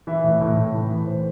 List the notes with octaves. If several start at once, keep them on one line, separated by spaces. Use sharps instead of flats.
E3 E5
A2
A2
A2
E3
E3
A2 C5